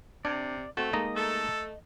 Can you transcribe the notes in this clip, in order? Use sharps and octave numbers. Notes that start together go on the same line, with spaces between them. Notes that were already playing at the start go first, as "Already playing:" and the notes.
C3 D4 D5
A3 C4 F#4
G#3 A#3 D#4 D#5 A#5
A3 A4